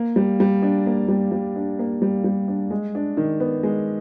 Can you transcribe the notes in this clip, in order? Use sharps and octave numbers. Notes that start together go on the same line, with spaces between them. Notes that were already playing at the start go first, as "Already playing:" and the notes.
Already playing: A#3
G3
G3
D4
A#3
G3
G3
D4
A#3
G3
G3
D4
G#3
D4
D#3
B3
G#3